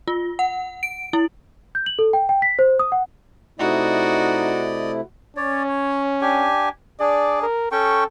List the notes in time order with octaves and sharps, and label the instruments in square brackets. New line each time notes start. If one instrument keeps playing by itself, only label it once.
[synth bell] F4
F#5
D7
E4
[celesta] G6
F#7
A4
G5
G5
B6
C5
D#6
F#5
[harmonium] C3 A3 E4 [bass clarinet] D#4 [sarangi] F#4 [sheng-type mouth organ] D5 D#5
[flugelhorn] C#4 [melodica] C#5 D5
[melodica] C#5
D4 G4 G#5
[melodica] D4 G#4 [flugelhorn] D5
[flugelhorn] A#4
[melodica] C#4 G5 C#6 [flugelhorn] A4